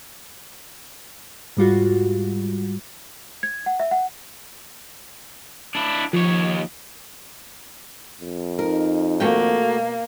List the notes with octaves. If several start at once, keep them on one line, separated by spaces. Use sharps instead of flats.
G#2 G3 F4 F#4
G#6
F#5
E5
F#5
D4 E4
D#2 F3 C#5
F2
D#4 A#4
D#2 B2 A3 A#3 F#4 G5
B2